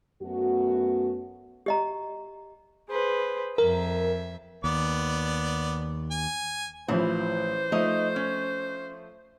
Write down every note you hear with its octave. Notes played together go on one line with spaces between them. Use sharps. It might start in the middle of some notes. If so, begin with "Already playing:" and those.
F#2 A3 B3 F#4
G4 D#5 A#5
G#4 B4 C5
F2 A#4 E5
D#2 B3 D5 D6
G#5
A1 E3 F3 C5
F3 A3 D#4 D#5
C#4